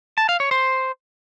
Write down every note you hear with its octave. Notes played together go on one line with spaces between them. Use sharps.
A5
F5
C#5
C5